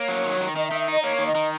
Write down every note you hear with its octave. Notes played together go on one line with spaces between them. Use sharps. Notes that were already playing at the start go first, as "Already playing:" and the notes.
Already playing: A#3 C#5
F#3
D#3
D#3
D#3 D#5
E5
D#3
E5
D#4 D#5
A#3 C#5
D#3
D#5
D#3